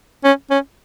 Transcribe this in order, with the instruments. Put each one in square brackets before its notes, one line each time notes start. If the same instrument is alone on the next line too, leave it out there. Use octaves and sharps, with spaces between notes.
[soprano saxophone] C#4
C#4